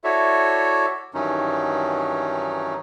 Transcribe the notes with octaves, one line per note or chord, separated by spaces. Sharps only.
E4 F#4 A4 C#5 D5 E5
G2 D#3 E3 F#3 C#4 D#4